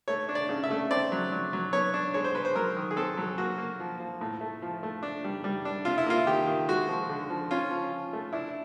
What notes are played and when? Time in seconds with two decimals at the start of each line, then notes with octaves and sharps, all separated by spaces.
0.08 A3 C#5
0.29 D4
0.35 D5
0.49 C#3
0.64 E5
0.71 A3
0.91 C4 D5
1.12 F#3
1.32 F#3
1.53 F#3
1.73 B3 C#5
1.94 D4
2.14 G#3 C#5
2.24 C5
2.35 G#3 B4
2.45 C5
2.55 F#3 A#4
2.76 D#3
2.91 G#4
2.97 C4 A4
3.17 F#3
3.38 A#3 F#4
3.58 A#3
3.80 F3
4.00 F3
4.21 A2
4.41 A3
4.62 F3
4.83 A3
5.03 D4
5.24 G3
5.44 G3
5.65 D4
5.85 C3 F4
5.98 E4
6.06 A#3 F4
6.27 D#3 G4
6.47 D#3
6.68 G#3 F#4
6.89 F3
7.10 D3
7.30 F3
7.51 C#4 F4
7.71 F3
7.92 F3
8.13 A3
8.33 D4 E4